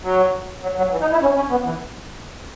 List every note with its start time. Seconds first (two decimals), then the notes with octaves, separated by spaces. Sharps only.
0.04 F#3
0.63 F#3
0.78 F#3
0.92 E3
1.02 D#4
1.11 E4
1.22 C#4
1.36 C#4
1.51 B3
1.65 E3